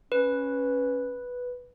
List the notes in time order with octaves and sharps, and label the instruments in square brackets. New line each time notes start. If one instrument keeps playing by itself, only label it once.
[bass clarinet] C#4 [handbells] B4